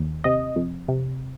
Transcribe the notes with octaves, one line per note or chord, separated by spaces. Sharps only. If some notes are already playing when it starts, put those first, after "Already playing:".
Already playing: D#2
C3 D#5
F2
C3